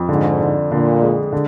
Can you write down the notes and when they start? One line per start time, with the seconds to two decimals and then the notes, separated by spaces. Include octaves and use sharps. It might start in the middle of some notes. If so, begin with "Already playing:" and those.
Already playing: F2
0.09 G#2 D3
0.40 D3
0.71 A#2 D3
1.02 G#3
1.32 D3